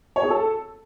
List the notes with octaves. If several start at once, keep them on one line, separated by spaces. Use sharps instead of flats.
C#5
G#4
A4